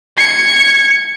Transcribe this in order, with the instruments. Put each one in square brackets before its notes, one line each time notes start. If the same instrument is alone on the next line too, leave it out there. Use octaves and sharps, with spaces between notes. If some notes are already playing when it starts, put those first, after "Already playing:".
[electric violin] G#6 C#7